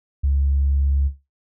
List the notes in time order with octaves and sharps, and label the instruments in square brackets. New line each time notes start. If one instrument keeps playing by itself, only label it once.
[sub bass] C#2